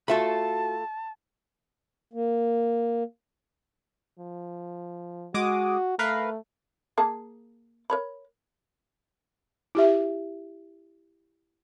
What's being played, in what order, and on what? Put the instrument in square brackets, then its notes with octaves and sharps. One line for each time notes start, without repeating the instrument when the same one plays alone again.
[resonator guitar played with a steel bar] A3 F4 A4 [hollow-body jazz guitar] F#4 E5 B5 [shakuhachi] A5
[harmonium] A#3
[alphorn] F3
[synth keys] G#3 D6 D#6 [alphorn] F#4
[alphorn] A3 [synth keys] A#4 B4 F5
[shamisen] A#3 G#4 A5
A#4 C#5 B5
[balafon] E4 G4 E5